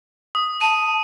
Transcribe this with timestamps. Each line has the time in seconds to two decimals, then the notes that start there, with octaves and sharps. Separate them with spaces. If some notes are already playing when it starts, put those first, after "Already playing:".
0.35 D#6
0.61 A5 D#7